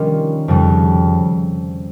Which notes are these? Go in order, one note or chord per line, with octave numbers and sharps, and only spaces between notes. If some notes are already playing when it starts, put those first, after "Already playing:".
Already playing: D#3 G3 C#4 F4
F2 C#3 G3